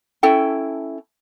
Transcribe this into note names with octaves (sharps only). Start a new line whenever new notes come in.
C#4 E4 A4 G5